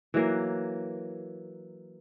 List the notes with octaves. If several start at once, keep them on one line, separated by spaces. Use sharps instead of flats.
E3 F#3 A#3